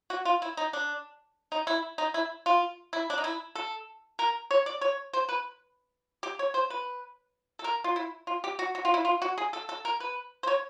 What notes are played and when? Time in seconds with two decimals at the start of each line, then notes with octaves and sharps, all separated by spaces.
0.10 F#4
0.25 F4
0.42 E4
0.57 D#4
0.73 D4
1.52 D#4
1.67 E4
1.98 D#4
2.14 E4
2.46 F4
2.93 E4
3.10 D4
3.18 D#4
3.24 E4
3.55 A4
4.19 A#4
4.51 C#5
4.66 D5
4.81 C#5
5.13 C5
5.29 B4
6.23 G4
6.39 C#5
6.54 C5
6.70 B4
7.59 A4
7.64 A#4
7.84 F4
7.96 E4
8.27 F4
8.44 G4
8.59 F#4
8.75 F#4
8.85 F4
8.94 E4
9.05 F4
9.22 F#4
9.38 G#4
9.53 A4
9.69 A4
9.85 A#4
10.00 B4
10.43 C5
10.47 C#5